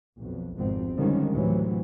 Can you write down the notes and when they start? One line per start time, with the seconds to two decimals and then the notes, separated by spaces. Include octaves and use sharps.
0.17 B1 F2
0.56 G#1 F2 G#2 B2 C4
0.98 D3 D#3 F3 G3 G#3 C#4
1.32 D2 A2 C3 E3 F#3